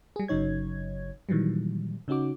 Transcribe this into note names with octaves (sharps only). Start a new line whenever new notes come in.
G3 G#4
G1 C#3 F#3 D#4 C#5 G#6
A#2 D#3 E3 F#3 G3
C#3 C#4 D#4 F#4 D6